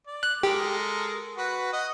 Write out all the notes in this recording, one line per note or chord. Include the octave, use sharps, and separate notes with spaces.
D5
F#6
G#3 G4 A4 A#4
F#4 B4
D#5 F#5